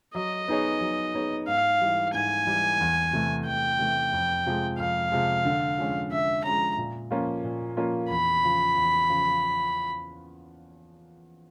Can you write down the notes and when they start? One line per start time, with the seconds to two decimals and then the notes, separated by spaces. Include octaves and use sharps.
0.15 F#3 D#5
0.48 B3 D#4 G#4 C#5
0.81 F#3
1.14 B3 D#4 G#4 C#5
1.47 G#2 F5
1.81 E3 G3
2.14 G#2 G#5
2.47 E3 G3
2.80 E2
3.13 C3 E3 A3
3.46 E2 G5
3.79 C3 E3 A3
4.13 F2
4.46 C3 F3 G#3
4.78 F2 F5
5.12 C3 F3 G#3
5.45 D3
5.78 F3 G#3 C#4
6.12 D3 E5
6.44 F3 G#3 C#4 A#5
6.78 A#2
7.11 F3 A#3 C#4 F4
7.44 A#2
7.77 F3 A#3 C#4 F4
8.10 E2 B5
8.43 C#3 F3
8.76 E2
9.10 C#3 F3